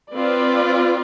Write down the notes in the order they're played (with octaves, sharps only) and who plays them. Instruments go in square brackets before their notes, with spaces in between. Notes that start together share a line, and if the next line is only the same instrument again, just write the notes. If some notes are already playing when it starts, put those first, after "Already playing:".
[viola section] C4 F4 B4 D5